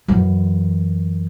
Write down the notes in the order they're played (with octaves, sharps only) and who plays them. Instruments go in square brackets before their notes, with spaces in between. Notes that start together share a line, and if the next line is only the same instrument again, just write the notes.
[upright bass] F#2 E3